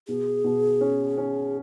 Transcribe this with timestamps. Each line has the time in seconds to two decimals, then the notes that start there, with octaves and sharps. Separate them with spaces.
0.08 B2 G#4
0.44 B2
0.81 C#4
1.18 C#4